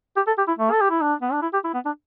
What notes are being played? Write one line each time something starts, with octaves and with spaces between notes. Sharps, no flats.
G4
A4
G4
E4
A3
A4
G4
E4
D4
B3
D4
E4
G4
E4
B3
D4